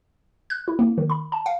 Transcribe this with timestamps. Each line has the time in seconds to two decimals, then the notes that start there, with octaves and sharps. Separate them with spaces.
0.50 F#6
0.68 E4
0.79 A#3
0.98 D#3
1.10 B5
1.32 A5
1.46 F5